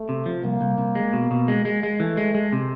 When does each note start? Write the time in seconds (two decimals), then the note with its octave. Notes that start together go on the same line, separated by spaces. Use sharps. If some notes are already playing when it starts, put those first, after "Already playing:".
Already playing: A3
0.09 C3
0.26 F3
0.44 C2 A#3
0.61 C2
0.78 C2
0.95 G#3
1.13 B2
1.31 B2
1.48 G#3
1.65 G#3
1.83 G#3
2.00 E3 A3
2.17 G#3
2.35 G#3
2.53 C3